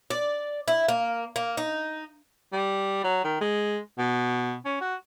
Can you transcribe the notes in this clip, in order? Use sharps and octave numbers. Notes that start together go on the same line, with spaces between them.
D5
E4
A#3
A#3
D#4
G3
F#3
D#3
G#3
B2
C#4
F#4